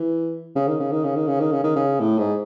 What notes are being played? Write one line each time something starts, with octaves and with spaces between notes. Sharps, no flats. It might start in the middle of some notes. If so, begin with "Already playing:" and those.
Already playing: E3
C#3
D#3
C#3
D#3
C#3
D#3
C#3
D#3
C#3
D#3
C#3
A2
G#2